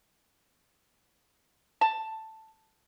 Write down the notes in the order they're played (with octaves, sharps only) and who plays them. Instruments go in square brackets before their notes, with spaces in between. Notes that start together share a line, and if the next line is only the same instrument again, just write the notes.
[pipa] A5